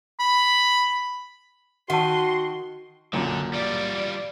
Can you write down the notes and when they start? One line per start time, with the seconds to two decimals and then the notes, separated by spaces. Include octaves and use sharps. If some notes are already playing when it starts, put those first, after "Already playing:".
0.20 B5
1.90 D#3 F#4 F#5 A5 C6
3.13 B1 F#2 A#2 D3
3.53 G3 F4 D5